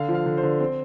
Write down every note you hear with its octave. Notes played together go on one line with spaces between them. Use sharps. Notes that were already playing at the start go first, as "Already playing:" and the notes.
Already playing: D3 F5
F3
F5
D3
C5
D3
C4